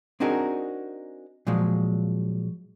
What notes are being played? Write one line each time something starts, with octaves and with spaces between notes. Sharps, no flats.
C4 D4 D#4 F#4 G#4 A#4
A#2 F3 F#3 G#3